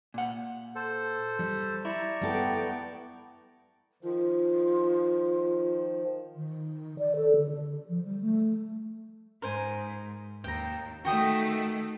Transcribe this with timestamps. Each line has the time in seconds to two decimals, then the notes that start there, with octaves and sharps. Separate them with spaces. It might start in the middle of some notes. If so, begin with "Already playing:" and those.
0.14 A#2 F#5
0.75 A4 C5
1.39 G3
1.85 E4 D5 A#5 C#6
2.21 G3 B3 A4 G5
4.03 D#3 F3 F4
6.36 D#3
6.99 D5
7.16 A4
7.36 D3
7.89 F3
8.05 G3
8.21 A3
9.42 G#2 A#4 C5 G#5
10.44 D#2 G5 A#5
11.05 D#3 A3 F#4 G5 D#6